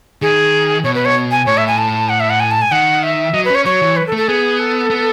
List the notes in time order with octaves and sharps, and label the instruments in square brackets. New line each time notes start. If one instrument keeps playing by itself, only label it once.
[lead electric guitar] D#3 [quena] G#4
[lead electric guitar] B2 [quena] C#5
[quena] B4
C#5
G#5
[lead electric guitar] A2 [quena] C#5
[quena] E5
G#5
A5
F#5
E5
F#5
G#5
A5
G#5
[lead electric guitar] D#3 [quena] F#5
[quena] E5
[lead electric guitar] F#3 [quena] D#5
[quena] B4
[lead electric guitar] C#4 [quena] C#5
[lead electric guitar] F#3 [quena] C#5
[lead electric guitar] E3
[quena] B4
A4
[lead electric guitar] A3
[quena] A4
[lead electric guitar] B3 [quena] G#4
[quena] A4
[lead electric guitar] B3